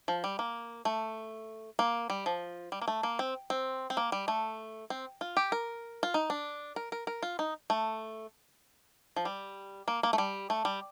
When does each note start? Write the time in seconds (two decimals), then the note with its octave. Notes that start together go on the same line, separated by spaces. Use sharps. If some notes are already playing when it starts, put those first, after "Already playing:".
0.08 F3
0.24 G3
0.39 A#3
0.85 A3
1.79 A#3
2.10 G3
2.26 F3
2.72 G3
2.82 A#3
2.88 A3
3.03 A#3
3.19 C4
3.50 C4
3.90 C4
3.97 A#3
4.12 G3
4.28 A3
4.90 C4
5.21 F4
5.37 G4
5.52 A#4
6.03 F4
6.14 D#4
6.30 D4
6.76 A#4
6.92 A#4
7.07 A#4
7.23 F4
7.39 D#4
7.70 A3
9.16 F3
9.25 G3
9.88 A#3
10.03 A#3
10.13 A3
10.18 G3
10.50 A3
10.65 G3